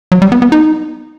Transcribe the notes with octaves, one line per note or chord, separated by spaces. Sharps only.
F#3
G3
B3
B3
D#4